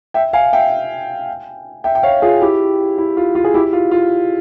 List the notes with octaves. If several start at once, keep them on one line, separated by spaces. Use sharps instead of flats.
E5 G5
F5 G#5
E5 G5
E5 G5
G5
C#5 F5
F4 G#4
E4 G4
E4
F4
F4
G#4
E4 G4
F4
F4